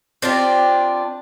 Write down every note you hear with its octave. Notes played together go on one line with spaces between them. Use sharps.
C4 D4 F4 G4